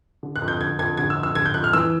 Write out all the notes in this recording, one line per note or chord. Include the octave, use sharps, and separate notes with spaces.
D3
F#6
F2
G6
D3 G#6
F2 G#6
D3 G#6
E6
F2
E6
D3 G#6
G6
F2 F#6
F6
E3 E6